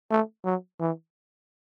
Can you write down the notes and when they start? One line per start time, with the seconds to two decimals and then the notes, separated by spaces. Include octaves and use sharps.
0.11 A3
0.45 F#3
0.80 E3